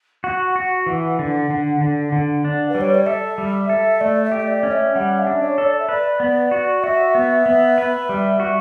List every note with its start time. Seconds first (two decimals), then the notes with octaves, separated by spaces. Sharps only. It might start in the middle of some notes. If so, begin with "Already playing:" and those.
0.24 F#4 F#5
0.56 F#4
0.86 E3
1.19 D3
1.50 D3
1.81 D3
2.12 D3
2.44 D4
2.69 B4
2.75 G3
2.81 C#5
2.94 D5
3.06 A4 E5
3.38 G3
3.69 A4
4.00 A3 D5
4.24 E5
4.32 G4
4.39 E5
4.47 D5
4.63 C#4
4.71 E5
4.94 G3 F#5
5.19 E5
5.26 D4
5.41 C#5
5.58 A4
5.65 D5
5.79 E5
5.89 B4 D5
6.20 B3
6.51 F#4
6.83 F#4 E5
7.15 B3
7.46 B3
7.78 B4
8.09 G3
8.40 F#4